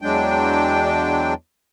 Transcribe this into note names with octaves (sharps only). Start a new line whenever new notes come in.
E2 F#3 G#3 D4 G5